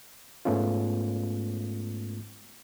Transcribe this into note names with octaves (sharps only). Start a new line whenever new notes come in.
G#2 G#3 A3 B3 C#4 F4